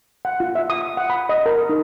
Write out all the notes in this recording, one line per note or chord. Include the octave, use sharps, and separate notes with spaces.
F#5
F4
E5
D#6
F#5
B5
D#5
A#4
D#4